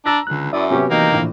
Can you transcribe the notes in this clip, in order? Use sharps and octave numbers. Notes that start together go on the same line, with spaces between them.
D4 A#5 E6 A#6
C#2 D3 F#6
F#2 E4 D5 E5 D#6
C3 F#3 B3 C#4 G4
E3 A#3 D#4 G5 A#5
A#1 A2 D3